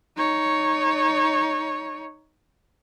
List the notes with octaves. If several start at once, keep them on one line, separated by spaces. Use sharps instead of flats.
D#4 C#5